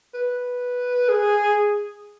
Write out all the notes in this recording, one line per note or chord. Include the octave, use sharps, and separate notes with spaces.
B4
G#4